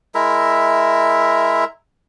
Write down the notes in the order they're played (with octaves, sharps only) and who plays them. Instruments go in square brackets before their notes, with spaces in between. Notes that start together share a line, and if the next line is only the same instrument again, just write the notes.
[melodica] G#3 E4 A#4 E5